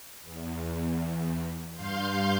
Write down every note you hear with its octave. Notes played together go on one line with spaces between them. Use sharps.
E2
G2 F5 C6 G6